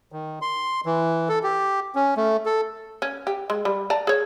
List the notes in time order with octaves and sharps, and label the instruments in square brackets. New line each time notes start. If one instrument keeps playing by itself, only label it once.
[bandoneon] D#3
C6
E3
A4
G4
C#4
A3
A4
[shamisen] C#4
G4
G#3
G3
D5 A5 A#5
G#4 C#5